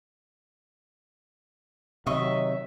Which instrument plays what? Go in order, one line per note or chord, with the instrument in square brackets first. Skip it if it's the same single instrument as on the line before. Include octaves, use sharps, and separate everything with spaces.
[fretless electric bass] C3 [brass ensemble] D#3 F#3 [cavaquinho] D#5 C#6 [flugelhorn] E5